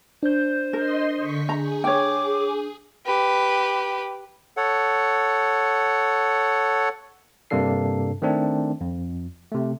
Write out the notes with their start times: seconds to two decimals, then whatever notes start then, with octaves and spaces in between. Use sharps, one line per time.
0.23 D4 C5 G6
0.73 A#4 D#5 C6
1.17 D3 C#6 B6
1.49 G#4 A#5
1.84 C#5 G5 D6
3.06 G4 B4
4.57 A4 C#5 F#5
7.50 G2 C3 A#3 D4 A4 C7
8.22 D#3 A3 C4 D4
8.81 F2
9.52 C3 A3